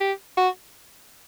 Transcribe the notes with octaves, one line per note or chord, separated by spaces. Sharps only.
G4
F#4